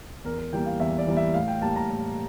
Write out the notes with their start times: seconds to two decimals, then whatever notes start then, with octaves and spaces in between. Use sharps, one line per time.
0.24 E2 A#4
0.38 A#4
0.53 E3 G3 A#3 G5
0.66 F5
0.80 E2 E5
0.98 D5
1.07 E3 G3 A#3
1.17 E5
1.34 A2 F5
1.48 G5
1.61 G3 A#3 A5
1.76 A#5
1.89 A2